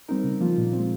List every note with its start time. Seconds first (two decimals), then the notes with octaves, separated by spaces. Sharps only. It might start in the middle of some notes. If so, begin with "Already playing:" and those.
0.08 G3 C4 D#4 A#4
0.24 C#3
0.41 F3 A#3 F4
0.58 A#2
0.73 C4
0.79 G#3